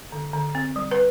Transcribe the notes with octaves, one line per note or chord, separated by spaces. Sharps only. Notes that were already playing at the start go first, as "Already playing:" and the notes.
D3
D3
C4
G3
B4